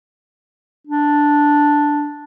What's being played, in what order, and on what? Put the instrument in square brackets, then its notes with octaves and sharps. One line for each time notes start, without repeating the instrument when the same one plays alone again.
[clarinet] D4